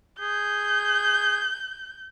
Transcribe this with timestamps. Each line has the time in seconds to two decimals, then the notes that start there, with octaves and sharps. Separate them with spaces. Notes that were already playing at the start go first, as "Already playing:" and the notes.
0.20 G#4 G6